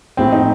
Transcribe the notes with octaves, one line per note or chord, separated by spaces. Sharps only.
A#1 A2 C4
D#4